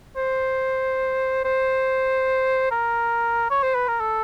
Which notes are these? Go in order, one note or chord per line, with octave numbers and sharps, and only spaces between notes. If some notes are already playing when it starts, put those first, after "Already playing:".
C5
C5
A#4
C#5
C5
B4
A#4
A4